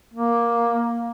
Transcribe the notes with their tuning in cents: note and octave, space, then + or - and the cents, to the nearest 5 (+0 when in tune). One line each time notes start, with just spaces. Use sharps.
A#3 +10